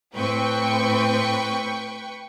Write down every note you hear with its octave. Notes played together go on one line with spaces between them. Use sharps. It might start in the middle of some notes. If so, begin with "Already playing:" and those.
A2 C4 B4 G5 C#6